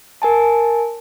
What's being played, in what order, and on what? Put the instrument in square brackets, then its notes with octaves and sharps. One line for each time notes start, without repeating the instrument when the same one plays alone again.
[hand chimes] A#4 G#5 A5